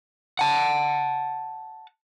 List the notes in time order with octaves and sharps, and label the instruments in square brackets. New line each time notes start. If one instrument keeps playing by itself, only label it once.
[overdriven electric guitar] F#5 A5